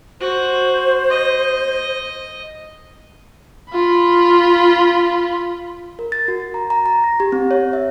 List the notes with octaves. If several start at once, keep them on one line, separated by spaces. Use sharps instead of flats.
F#4 C5
D#5
F4 B5
A#4
A6
F#4
A6
A#5
A#5
A#5
A#6
G4
C4
C#5
E5